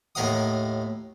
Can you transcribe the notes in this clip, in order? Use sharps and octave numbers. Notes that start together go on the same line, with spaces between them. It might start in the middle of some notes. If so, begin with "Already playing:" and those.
D#2 A2 A#4 F5 F#5 D#6